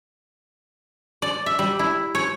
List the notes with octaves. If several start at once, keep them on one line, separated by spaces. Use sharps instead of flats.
D5
E5
G3
E4
C#5